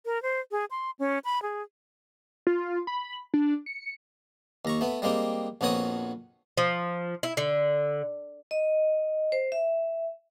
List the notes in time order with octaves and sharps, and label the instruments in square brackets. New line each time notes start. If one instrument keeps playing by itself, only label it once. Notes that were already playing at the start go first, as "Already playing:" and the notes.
[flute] A#4
C5
G#4
C6
C#4
B5
G#4
[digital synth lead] F4
B5
D4
C#7
[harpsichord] D#2 A#5 C#6
A3 B3
G3 G#3 A#3 C4
A#1 F2 B3 F#4 C#5 D#6
[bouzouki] F3
E4
D3
[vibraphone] D#5
C5
E5